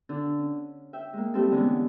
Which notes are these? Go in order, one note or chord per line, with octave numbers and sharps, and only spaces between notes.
D3 D4
C#4
E5 G5
G#3 A#3
G3 A3 C4 E4 G4 A4
D3 E3 G#3 B3 C#4 E4